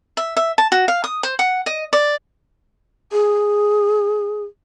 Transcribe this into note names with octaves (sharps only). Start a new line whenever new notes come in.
E5
E5
A5
F#4
F5
D#6
C5
F#5
D#5
D5
G#4